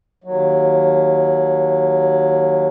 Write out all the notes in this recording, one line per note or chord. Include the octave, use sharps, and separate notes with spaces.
D#2 F#3